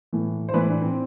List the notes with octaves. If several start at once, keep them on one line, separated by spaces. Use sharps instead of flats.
A2 E3
C5
A2 E3 B4
D4
C4